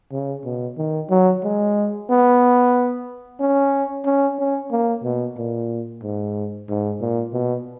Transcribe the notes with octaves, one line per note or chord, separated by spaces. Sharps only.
C#3
B2
D#3
F#3
G#3
B3
C#4
C#4
C#4
A#3
B2
A#2
G#2
G#2
A#2
B2